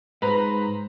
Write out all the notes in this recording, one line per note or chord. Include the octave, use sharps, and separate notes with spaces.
G#2 B4 C5 A#5